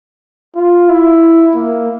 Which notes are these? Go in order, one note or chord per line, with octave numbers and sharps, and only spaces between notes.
F4
E4
A#3